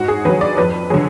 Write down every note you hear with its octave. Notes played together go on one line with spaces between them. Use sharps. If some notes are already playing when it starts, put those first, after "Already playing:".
Already playing: G#2 F#4
G#4
D#3 F#3 B4
D5
F2 B4
D3 F#3 G#4